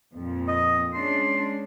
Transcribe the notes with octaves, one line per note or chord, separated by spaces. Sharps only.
F2 A#2
D#5
G#3 C#4 D4 C6